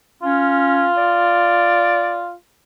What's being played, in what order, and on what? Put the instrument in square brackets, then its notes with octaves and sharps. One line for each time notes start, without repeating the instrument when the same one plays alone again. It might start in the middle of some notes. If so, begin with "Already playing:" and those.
[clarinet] C#4 [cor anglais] F4
[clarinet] D5